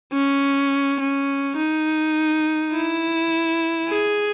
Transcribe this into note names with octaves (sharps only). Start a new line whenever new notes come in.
C#4
C#4
D#4
E4
G#4